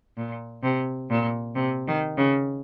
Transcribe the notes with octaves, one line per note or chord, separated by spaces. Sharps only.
A#2
C3
A#2
C3
D#3
C#3